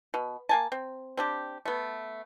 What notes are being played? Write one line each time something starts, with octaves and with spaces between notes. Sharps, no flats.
B2
A#3 G#5 A5
C4
C4 D4 G4
A3 B3